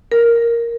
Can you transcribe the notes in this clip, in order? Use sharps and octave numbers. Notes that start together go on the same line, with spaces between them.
A#4